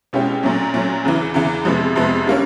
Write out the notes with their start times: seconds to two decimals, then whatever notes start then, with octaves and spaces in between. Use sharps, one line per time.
0.13 B2 G#3 C#4 E4 G4
0.43 A#2 F#3 A3 C#4
0.74 A#2 F#3 A3 C#4
1.04 E2 C#3 E3
1.34 E2 C#3 E3
1.65 F2 C3 F3 G#3 B3
1.96 F2 C3 F3 G#3 B3
2.26 D3 G3 A#3 C#4